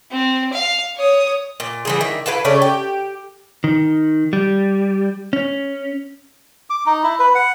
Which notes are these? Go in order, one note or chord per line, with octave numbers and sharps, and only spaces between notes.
C4
F5
C#5 D#6
A#2
E3 G3 G#4
D#3 E4
E4 B4 F5 A5
C#3 A3 C#4 D5
G4
D#3
G3
C#4
D6
D#4
E4
B4
F#5